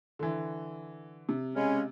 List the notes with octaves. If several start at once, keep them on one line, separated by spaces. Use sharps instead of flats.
D3 E3
C3
C#3 G#3 C#4